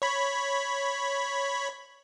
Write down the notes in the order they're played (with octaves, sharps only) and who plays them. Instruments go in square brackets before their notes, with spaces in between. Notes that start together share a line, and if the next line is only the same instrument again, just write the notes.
[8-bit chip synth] C#5 B5